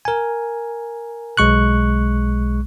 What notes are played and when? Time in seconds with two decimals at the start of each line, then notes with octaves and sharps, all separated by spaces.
0.05 A#4 G#5
1.37 B1 G#3 C#6 F#6